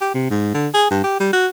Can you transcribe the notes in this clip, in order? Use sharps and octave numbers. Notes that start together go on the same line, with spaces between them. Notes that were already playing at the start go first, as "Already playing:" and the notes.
G4
C3
G#2
D3
G#4
G2
G4
G3
F#4